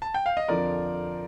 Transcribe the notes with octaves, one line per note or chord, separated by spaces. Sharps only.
A5
G5
F5
D#5
F2 D3 F3 A#4 D5